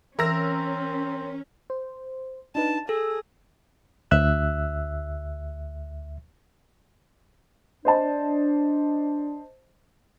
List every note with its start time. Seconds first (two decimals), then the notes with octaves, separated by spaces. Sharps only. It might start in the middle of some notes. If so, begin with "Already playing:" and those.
0.19 E3 C4 C#4 A#4 E6 A#6
1.70 C5
2.55 D4 D#4 B4 A5
2.89 G#4 A4 E6
4.11 D2 E5 E6 F#6
7.85 D4 C5 D#5 A5